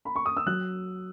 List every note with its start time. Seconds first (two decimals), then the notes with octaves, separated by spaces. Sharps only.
0.05 B5
0.16 C#6
0.26 D#6
0.37 E6
0.46 F#3 F#6